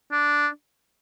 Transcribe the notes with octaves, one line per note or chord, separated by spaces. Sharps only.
D4